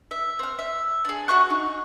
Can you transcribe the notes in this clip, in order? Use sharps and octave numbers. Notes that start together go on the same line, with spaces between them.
E5
C4 F6
E5
D4 G#4
F#4 E5 C#6 F#6
D#4